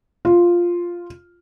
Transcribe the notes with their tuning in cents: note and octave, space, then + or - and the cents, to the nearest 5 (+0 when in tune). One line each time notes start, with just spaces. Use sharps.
F4 +0